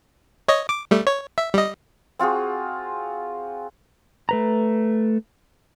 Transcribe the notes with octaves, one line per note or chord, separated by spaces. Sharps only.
C#5 D#5
D6
G3 A3
C#5
E5
G3 D#5
C4 F4 F#4 G#4
A3 B4 A#5